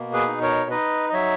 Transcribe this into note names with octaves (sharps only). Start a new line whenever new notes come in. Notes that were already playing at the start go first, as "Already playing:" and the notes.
Already playing: B2 A#3
G#4 B4
D#4
A#4 C#5
D#4 B4 D#5
D#5
F#3 C#5 E5